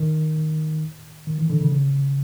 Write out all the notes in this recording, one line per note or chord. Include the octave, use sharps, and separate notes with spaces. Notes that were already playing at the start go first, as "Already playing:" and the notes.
Already playing: D#3
D#3
E3
D3
C#3
C#3